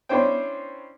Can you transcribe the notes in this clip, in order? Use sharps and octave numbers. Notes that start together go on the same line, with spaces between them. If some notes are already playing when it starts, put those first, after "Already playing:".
C#4 D4 E4 C5 C#5 G5